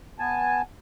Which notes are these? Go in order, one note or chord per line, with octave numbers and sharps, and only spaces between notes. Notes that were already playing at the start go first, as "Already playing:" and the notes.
B3 G#5 A5